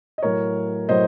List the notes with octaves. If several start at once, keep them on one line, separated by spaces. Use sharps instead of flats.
D#5
A2 F#3 A#4 C#5
A2 F#3 C5 D#5